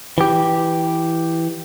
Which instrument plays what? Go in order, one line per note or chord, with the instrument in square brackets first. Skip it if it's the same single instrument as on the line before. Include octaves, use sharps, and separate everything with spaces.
[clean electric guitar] E3 G4